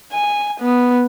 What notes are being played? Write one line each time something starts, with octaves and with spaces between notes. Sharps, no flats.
G#5
B3